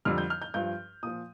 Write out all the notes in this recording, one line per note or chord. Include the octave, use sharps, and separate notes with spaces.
F2 D3 G3 F6
G6
F6
G6
G2 F3 G6
A#2 F3 D#6